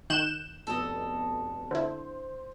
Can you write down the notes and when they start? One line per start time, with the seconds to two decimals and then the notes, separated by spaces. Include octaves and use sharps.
0.10 D#3 F#6 G6 E7
0.67 F1 B2 A4 D#5
1.71 D3 E4 C5